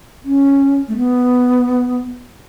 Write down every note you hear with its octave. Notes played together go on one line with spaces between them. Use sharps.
C#4
A3
B3